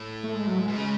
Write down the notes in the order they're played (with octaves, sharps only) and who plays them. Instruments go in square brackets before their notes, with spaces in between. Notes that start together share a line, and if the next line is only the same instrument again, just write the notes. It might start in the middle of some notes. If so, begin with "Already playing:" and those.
Already playing: [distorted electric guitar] A2
[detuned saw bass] A3
G#3
F#3
G#3
[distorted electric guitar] B2
C#3